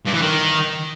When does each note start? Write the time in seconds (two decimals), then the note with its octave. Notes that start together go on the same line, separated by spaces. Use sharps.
0.06 G2
0.14 E3
0.22 D#3